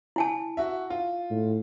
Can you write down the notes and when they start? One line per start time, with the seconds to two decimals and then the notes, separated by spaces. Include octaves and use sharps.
0.16 E4 G#5 A5
0.57 F#4 E5
0.90 F4
1.30 A2